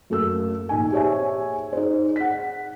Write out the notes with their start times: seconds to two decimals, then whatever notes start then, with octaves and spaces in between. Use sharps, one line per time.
0.10 F#2 A3 A#3 E6
0.69 A#1 D#4 G#5
0.92 G4 G#4 C5 C#5 E5 G#5
1.73 D#4 G#4 C5
2.16 F#5 B6